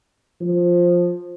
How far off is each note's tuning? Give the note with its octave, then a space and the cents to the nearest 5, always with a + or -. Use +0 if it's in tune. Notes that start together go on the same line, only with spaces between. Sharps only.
F3 +10